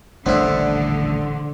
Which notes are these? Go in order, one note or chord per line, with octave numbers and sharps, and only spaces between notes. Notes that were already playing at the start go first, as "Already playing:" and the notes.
D#1 A1 D3 B3 D4 E4 C5 D5